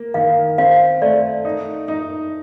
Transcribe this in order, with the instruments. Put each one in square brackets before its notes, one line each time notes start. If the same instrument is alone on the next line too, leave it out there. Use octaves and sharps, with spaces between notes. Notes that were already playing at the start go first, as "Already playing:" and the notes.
Already playing: [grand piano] A#3
[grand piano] D#3 [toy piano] F5
[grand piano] C4 [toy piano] F5
[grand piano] A3 [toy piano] D5
[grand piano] D#4
D#4